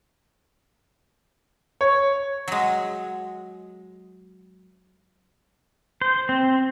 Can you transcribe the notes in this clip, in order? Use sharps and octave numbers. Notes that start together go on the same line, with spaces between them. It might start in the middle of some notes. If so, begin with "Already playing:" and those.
C#5
F#3 G#3
C5
C4